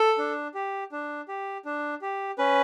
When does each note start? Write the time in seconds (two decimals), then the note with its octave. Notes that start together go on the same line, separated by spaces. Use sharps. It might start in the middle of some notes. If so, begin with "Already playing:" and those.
Already playing: A4
0.18 D4
0.54 G4
0.92 D4
1.28 G4
1.65 D4
2.02 G4
2.38 C#4 B4